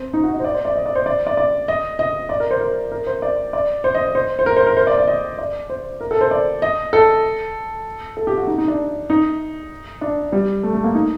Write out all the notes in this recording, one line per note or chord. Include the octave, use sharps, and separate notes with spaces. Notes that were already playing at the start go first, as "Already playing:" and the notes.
Already playing: C4
D#4
F#4
D#5
C5
D5
C5
D5
D#5
D5
C5
D5
D5
D5
D#5
D#5
D5
A#4
C5
A#4
A#4
C5
D5
D5
C5
D#5
C5
C5
A#4
C5
A#4
C5
D5
D5
D#5
D5
C5
A#4
A4
C5
D5
D#5
A4
A4
G4
F#4
D#4
D#4
D4
D#4
D4
G3
A3
A3
A#3
D#4